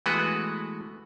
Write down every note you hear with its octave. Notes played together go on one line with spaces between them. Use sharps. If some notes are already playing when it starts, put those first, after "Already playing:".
E3 G#3 A3 B3 F#4 B4